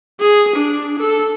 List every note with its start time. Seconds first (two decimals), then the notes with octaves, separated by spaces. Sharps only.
0.20 G#4
0.55 D4
0.99 A4